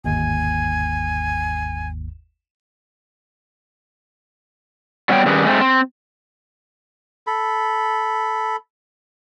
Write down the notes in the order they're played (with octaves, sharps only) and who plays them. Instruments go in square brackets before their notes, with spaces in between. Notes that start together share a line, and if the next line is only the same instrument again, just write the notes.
[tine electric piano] G1 D#2 G#2 [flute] G#5
[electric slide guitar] F#3 G3 B3 D4 C#5 G5
D#3 G3 C#4 G4 G#4 B4
G#3 A3 B3 C4
C4
[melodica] A4 B5